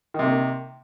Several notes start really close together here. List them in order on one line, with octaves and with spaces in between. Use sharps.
D#3 C3 A#3